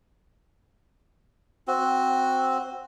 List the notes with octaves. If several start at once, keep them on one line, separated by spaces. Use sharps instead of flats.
C4 F#4